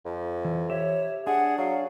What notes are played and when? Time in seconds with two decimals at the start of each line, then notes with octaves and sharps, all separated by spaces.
0.05 F2
0.45 E3
0.70 G4 C#5 E5
1.27 D4 G#4 F#5
1.58 F#3 F5